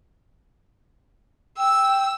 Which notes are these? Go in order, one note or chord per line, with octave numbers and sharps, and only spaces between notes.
G5 E6